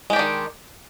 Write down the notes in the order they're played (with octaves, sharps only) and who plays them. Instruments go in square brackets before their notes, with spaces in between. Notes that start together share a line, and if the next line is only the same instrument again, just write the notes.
[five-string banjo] G#3
G4
D4
D#3